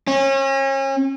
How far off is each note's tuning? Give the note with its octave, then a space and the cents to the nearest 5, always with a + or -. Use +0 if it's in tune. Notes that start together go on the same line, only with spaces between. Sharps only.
C#4 -35